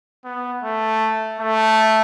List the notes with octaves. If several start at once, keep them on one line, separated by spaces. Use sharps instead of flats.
B3
A3
A3